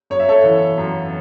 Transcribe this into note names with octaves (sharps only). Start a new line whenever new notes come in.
F#2 C#5
E5
A4 C#5
E3
F#2